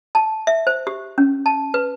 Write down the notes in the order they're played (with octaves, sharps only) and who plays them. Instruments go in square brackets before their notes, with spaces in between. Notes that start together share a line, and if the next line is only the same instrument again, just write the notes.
[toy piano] A5
E5
C5
G4
C#4
A5
B4